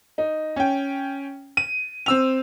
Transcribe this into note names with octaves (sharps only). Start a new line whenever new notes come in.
D#4
C#4 G5
D#7
C4 E6 F7